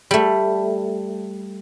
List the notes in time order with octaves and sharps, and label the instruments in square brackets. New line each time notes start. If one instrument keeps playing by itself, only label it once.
[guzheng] G3 A3